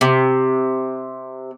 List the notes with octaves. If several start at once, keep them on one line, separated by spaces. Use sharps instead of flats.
C3